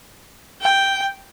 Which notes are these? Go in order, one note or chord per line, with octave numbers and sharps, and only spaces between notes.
G5